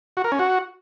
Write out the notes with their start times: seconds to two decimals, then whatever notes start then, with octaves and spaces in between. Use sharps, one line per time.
0.17 F#4
0.24 A#4
0.32 C#4
0.39 F#4